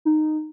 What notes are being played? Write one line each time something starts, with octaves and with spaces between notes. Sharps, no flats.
D#4